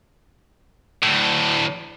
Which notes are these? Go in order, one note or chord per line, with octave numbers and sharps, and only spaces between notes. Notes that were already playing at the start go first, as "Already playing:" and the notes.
D2 A2